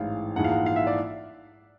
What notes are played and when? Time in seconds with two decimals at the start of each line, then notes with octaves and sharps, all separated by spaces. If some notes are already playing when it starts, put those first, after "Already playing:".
Already playing: A1 G#2 E3 G#3 F5
0.36 A#1 G#2 E3 G#3 F#5
0.44 F5
0.52 F#5
0.66 F5
0.76 E5
0.87 D5